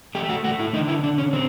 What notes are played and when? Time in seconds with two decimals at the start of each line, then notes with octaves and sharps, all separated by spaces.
0.15 A3 G4
0.29 F#4
0.44 A3 F#4
0.60 E4
0.73 D3 D#4
0.88 E4
1.03 D3 D4
1.18 C#4
1.33 D3 C4